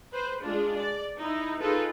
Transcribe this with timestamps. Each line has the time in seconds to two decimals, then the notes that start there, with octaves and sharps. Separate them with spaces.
0.12 B4 C5
0.43 G#3 D4 F4
0.79 D5
1.17 D#4 E4
1.60 D#4 F4 G#4 A4 B4